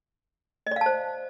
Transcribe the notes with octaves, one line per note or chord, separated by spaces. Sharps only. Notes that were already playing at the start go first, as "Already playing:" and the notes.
C5 D5 D#5 F5 A5